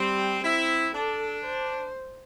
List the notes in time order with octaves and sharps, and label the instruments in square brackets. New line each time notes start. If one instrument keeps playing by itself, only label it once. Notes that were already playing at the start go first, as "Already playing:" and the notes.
Already playing: [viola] G3 [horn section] C4
[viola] C4 [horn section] E4
[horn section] D4 [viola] A4
[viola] C5